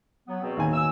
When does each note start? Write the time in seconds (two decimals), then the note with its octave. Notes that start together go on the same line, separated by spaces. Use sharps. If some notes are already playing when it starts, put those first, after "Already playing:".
0.28 F#3 B3
0.42 E2 B2 C4
0.57 D#2 G#5
0.73 E6